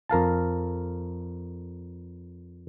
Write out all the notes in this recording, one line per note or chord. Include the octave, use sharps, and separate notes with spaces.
F2 A#4 F5 A5